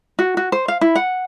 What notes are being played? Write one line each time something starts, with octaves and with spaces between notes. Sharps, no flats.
F#4
F#4
C5
F5
E4
F#5